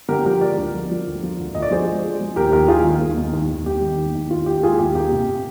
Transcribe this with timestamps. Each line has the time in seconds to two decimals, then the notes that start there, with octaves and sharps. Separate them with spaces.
0.09 D3 G4 A#4
0.26 F3 G4 A#4
0.41 G#3 A#4 D5
0.57 D2
0.74 F3
0.91 F3
1.07 D2
1.23 F3
1.39 D2
1.55 D2 D#5
1.62 D5
1.71 F3 G#4 C5
1.88 G#3
2.03 G#3
2.21 F3
2.36 D#2 G4 A#4
2.52 D#2 G4 A#4
2.68 D#2 F4 G#4
2.84 D#3
3.01 D#2
3.17 D#3
3.33 D#2
3.50 D#2
3.66 D#3 G4
3.81 D#3
3.98 D#2
4.15 D#2
4.30 D#2 F4
4.46 D#2 G4
4.63 G#3 F4 G#4
4.79 D#2 G4
4.95 A#3 G4
5.12 C3
5.28 C3